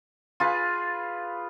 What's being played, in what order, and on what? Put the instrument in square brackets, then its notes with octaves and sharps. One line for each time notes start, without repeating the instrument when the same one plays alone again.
[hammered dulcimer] F4 G#4 B4